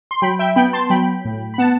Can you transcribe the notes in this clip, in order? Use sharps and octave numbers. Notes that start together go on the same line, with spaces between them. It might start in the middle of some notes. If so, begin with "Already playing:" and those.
C6
F#3 G5 B5
E5 G5
B3 G5 B5
A5 C6
F#3 G5 B5
A2
B5
B3 F#5 A5